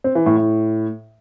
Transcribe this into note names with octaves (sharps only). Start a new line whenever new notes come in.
C4
E3
A2
A2